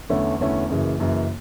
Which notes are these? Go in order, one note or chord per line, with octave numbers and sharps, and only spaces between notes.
E2 D3 A3 C#4 E4
E2 D3 A3 C#4 E4
F#1 F#2 C#3 E3
F#1 F#2 C#3 E3